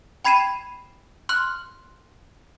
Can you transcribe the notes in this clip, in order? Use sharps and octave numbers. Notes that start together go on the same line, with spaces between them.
G5 B5 G#6 C7 D#7 E7
C6 F6 F#6